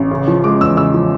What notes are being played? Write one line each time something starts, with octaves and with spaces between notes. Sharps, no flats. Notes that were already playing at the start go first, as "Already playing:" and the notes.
Already playing: A1
C#3
F3
G#3 D6
E2 E6
C#3 E6
F3